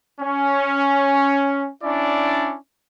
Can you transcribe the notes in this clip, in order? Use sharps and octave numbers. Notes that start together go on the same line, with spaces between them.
C#4
C#4 D4 E4 D5